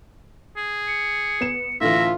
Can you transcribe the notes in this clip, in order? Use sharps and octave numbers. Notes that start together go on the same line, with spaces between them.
G#4
C#7
B3 E7
A2 D3 E3 F4 E5 A#6